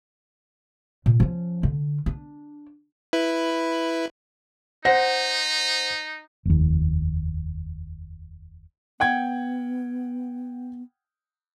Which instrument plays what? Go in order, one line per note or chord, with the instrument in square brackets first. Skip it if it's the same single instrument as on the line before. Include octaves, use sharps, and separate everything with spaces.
[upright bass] A#2
F3 C#4
D3
D4
[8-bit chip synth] E4 B4
[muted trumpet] D#4 [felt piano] C5 F#5 A#6
[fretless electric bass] F1 D#2
[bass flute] B3 [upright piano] F#5 G5 G#6